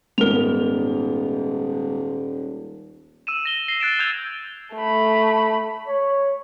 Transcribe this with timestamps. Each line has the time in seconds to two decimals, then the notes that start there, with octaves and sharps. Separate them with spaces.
0.18 D#1 G#2 B3 A#4 F7
3.27 E6 D#7 E7
3.45 A#6 G7
3.68 A#6 C7 G7
3.80 F#6 A6 D7 E7
3.99 E6 G6 G#6 F7 G7
4.76 A3 B5
5.88 C#5